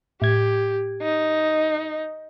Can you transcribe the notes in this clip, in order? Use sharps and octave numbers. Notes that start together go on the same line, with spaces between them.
A2 G4 G#6
D#4